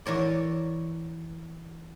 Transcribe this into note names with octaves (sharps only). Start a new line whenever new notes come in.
E3 A#4 C#5 D5